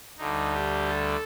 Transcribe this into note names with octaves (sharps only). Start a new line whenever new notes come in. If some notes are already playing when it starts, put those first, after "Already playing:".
D2 D3 G3 D#4
G4
A4